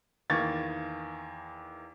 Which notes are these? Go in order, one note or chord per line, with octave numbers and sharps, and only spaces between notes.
E2 D#3 A#3 C#6 G#6 A6